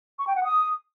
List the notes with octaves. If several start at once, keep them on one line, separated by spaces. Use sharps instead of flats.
C#6
G5
F#5
D#6